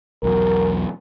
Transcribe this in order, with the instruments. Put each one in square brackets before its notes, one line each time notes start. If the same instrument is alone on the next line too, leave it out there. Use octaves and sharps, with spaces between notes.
[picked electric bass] B1 E2 F#3 [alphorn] A#4